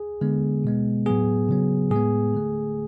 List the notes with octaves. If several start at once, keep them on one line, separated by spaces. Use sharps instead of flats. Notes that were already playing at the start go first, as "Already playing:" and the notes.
Already playing: G#4
D3 G#3 B3
B2 G#3 B3
A2 F#3 B3 G#4
C#3 F#3 B3
A2 G#3 B3 G#4
D3 A3